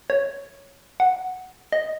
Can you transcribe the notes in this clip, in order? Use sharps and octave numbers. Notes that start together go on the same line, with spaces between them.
C#5
F#5
D#5